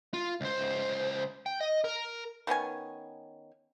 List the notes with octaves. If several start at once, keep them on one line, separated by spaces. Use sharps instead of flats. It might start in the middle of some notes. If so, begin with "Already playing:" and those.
F4
C#2 C5
G5
D#5
A#4
D#3 B3 C#4 G#5